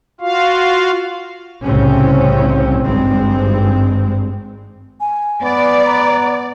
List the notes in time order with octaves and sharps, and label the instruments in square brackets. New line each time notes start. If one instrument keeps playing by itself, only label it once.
[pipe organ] F4 F#4 F5
[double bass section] C2 A2 C#3 C4 C#4
G#1 G2 G#3 C4
[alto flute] G#5
[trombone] B3 [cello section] D5
[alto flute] A#5